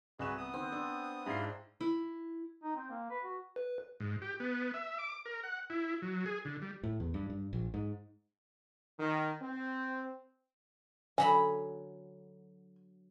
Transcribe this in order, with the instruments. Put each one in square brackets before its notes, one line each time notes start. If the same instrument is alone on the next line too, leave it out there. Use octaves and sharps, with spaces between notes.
[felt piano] C2 F#6 E7 [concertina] F#4 G#4 B4
[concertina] B3 D#6
[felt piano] D#3 [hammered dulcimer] C4
[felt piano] D4
[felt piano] G#2 C7 [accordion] D4 E4 F4
[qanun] E4
[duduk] D#4
C4
A#3
B4
F#4
[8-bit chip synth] B4
[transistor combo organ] G#2
G4
B3
E5
D6
A#4
F#5
E4
F#3
G#4
D3
G3
[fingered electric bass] A2
E2
G2
G2
A#1
G#2
[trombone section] D#3
C4
[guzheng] D3 F#3 B5 [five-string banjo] G#5